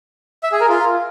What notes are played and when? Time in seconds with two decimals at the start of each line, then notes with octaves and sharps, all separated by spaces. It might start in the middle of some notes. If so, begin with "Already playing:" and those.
0.43 E5
0.52 G#4
0.61 A#4
0.69 F4